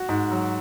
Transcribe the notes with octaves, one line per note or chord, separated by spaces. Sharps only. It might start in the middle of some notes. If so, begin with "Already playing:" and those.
Already playing: F#4
G#2
F#3